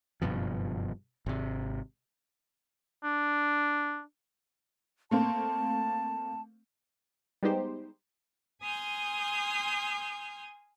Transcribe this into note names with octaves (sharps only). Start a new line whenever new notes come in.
F#1 G2 B2 F3
G#1 C3
D4
A3 A#3 C4 A5
G3 G#3 B3 D#4 G4 C5
G#5 C6 D#6 F6 G6